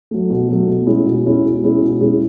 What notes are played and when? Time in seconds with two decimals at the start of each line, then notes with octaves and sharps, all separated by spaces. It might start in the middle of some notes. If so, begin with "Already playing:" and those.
0.11 F#3 A3
0.30 B2
0.48 F#3 A3
0.68 B2
0.86 G#3 C#4 E4 G#4
1.06 B2
1.25 G#3 C#4 E4 G#4
1.44 B2
1.63 G#3 C#4 E4 G#4
1.81 B2
2.01 G#3 C#4 E4 G#4